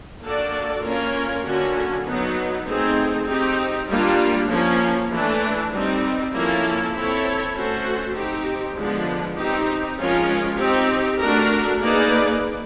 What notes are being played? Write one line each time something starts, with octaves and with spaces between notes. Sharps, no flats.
A#3 D4 F#4 A4 D5
A#3 C#4 F4 A#4 C#5
D3 F#3 A#3 C#4 F#4
F#3 B3 D#4
A3 C4 D#4 G#4
C4 D#4 G4
G3 A#3 D4 F4
F3 A#3 C#4
E3 A3 D4
G3 C4 D#4
F3 A#3 C#4 E4 A4
C4 E4 A4 C#5
A3 C#4 F#4 A4 C5
C4 D#4 G4
D3 F3 G#3 B3 D4
C4 D#4 G4
F3 G#3 C#4 F4 A#4
C4 D#4 G4
A3 D4 F#4 A#4
A#3 D#4 G#4 B4 D5